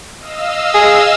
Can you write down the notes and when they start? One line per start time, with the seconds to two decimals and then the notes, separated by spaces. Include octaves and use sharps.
0.19 D#5 F5 E6
0.74 G#4